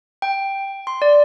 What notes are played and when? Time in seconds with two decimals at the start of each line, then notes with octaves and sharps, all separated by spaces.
0.22 G5
0.87 C6
1.02 D5